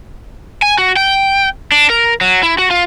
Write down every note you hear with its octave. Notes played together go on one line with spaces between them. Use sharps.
G#5
F#4
G5
D4
A#4
F#3
E4
F#4
F4